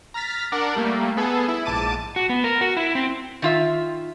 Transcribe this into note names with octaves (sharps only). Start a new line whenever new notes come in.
A#5 F6 A6 B6
D4 A#4 D5 F#5
G3 A3 A#3
B3 G#4 A4
E4
A#1 G#2 A5 D6 A6 D#7
F#4
B3
A#4
F#4
E4
C4
D#3 F4 E5